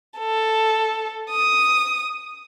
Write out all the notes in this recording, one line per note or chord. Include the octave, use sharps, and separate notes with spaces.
A4
D#6